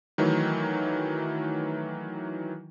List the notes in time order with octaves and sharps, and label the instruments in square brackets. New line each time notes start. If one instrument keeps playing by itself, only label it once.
[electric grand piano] D#3 E3 F#3 A3